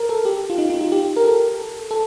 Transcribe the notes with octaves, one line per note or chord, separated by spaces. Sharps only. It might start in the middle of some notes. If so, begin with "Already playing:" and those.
Already playing: A#4
A4
G4
F4
D#4
D#4
F4
G4
A#4
A4
A4